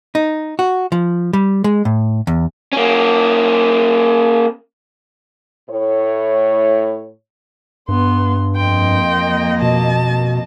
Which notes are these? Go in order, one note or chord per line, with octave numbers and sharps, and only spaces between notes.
D#4
F#4
F3
G3
G#3
A2
E2
A#3 C#4
A2 C#5
G2 B3 C6
F2 A#3 D#5 G5 C6
B2 A5